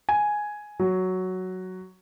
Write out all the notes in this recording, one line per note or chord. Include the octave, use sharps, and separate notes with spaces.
G#5
F#3